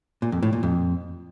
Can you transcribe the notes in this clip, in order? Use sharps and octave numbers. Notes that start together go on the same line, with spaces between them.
A#2
F2
A2
A#2
F2